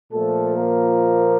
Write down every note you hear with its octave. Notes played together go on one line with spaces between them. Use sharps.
A#2 F3 A3 A4
A#3 A#4